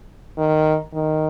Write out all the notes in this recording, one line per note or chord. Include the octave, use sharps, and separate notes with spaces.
D#3
D#3